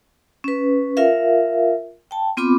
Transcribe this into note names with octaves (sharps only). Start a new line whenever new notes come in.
C#4 B4
F4 A#4 E5 F5
G5 A5
B3 C4 F4 B5 D6